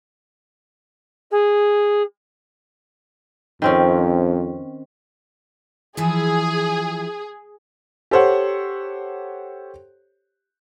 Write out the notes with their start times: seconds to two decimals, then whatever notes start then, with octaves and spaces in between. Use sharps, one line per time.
1.31 G#4
3.62 F2 D#3 C4 C#4
5.97 E3 F3 E4 G#4
8.11 G4 A4 C5 C#5 F#5